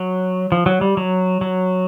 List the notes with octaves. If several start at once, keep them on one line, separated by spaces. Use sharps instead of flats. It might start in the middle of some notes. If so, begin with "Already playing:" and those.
Already playing: F#3
F3
F#3
G3
F#3
F#3